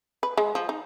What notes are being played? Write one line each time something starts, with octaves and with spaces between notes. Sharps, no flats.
B4
G#3
F3
D#4